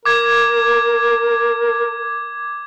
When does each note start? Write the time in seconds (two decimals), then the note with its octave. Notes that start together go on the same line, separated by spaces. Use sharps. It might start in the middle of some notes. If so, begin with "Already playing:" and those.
0.05 A#4 D6 G#6